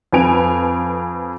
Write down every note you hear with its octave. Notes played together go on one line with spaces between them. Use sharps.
F2 F3 B4 G#5 D7 F7